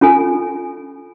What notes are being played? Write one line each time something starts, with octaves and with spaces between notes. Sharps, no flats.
C#4 F4 A4 G#5